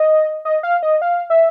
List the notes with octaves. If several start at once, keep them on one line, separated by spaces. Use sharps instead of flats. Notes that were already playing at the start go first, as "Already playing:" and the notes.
Already playing: D#5
D#5
F5
D#5
F5
E5